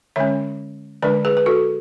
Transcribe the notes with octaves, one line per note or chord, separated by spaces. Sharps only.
D3 G#3 C#4 C#5 E5
D3 G#3 D4 B4 D5
G#4 B4
B4
F#4 A4